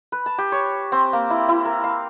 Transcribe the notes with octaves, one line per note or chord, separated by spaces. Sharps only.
B4
A5
G4
C#5
C4
A#3
E4
E4
A#4
F5